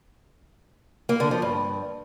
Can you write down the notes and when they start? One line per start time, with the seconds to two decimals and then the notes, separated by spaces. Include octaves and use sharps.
1.09 A#3
1.20 D3
1.31 F3
1.42 G2